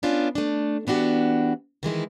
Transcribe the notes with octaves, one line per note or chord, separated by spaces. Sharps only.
B3 C#4 D4 F4
A3 D4
E3 B3 D4 F#4 G4
D#3 E3 G#3 E4